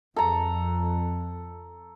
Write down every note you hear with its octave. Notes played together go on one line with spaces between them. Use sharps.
F2 A4 A#5